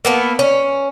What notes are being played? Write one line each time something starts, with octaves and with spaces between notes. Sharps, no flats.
A#3 B3 A4
C#4